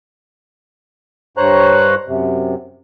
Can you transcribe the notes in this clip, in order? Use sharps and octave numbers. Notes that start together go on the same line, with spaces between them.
G2 C5 C#5 A#5 F#6
F#2 C3